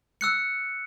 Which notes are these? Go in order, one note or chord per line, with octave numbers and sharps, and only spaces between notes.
E6 F#6 C#7